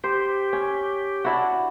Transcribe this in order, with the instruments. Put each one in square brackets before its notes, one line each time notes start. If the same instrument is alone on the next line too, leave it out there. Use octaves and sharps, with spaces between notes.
[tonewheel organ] G4 [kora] C5
[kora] C#4
D4 E4 F#4